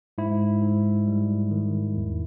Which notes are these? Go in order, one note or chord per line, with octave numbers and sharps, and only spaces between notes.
G#2 E4
G#2
G3
D#3
E2